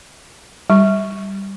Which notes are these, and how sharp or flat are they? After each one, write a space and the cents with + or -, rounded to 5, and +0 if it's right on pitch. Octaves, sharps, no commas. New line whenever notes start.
G3 +0 C#6 +0